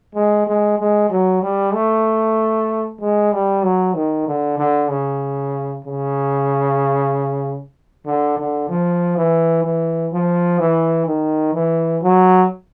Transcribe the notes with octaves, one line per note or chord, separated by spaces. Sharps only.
G#3
G#3
G#3
F#3
G3
A3
G#3
G3
F#3
D#3
D3
D3
C#3
C#3
D3
D3
F3
E3
E3
F3
E3
D#3
E3
F#3